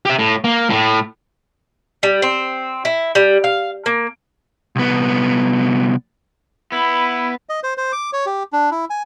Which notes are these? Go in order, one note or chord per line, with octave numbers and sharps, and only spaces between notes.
G4 E5
A2
A#3
A2 A3
G3
C4
E4
G3
F5
A#3
C2 B3
B3 E4 B5
D#5
C5
C5
D6
C#5
G4
D4
E4
G#5